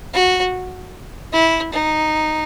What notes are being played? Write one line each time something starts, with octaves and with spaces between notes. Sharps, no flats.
F#4
E4
D#4